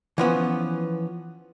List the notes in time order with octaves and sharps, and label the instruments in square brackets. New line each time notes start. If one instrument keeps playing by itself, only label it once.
[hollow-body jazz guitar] E3 F3 B3 C#4